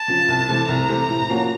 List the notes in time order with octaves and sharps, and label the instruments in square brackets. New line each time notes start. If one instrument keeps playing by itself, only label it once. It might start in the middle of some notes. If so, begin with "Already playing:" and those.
Already playing: [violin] A5
[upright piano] C#3 F3
C2
C3 E3 A3
[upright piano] C2 [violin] A#5
[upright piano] C3 E3 A3
A2
F3 A#3 C#4 F#4